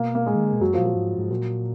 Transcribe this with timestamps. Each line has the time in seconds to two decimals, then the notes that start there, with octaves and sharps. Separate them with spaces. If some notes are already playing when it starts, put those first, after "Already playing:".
Already playing: B2 A#3
0.15 A#3
0.26 A#2 G#3
0.35 D#3
0.43 D3
0.53 B2
0.61 F#2 F#3
0.74 A#2 F3
0.86 F#3
0.95 G#2
1.18 G#2
1.31 A#2 F#3